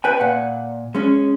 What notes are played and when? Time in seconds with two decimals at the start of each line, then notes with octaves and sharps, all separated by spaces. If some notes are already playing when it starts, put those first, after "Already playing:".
0.04 B4 G5 G#5
0.20 A#2 F#5
0.95 G#3 C#4